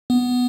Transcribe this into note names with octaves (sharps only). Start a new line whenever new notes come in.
B3